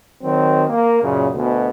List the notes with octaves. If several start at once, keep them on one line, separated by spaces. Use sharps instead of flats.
D#3 F#3 C4
A#3
F#2 A#2 C#3
D2 B2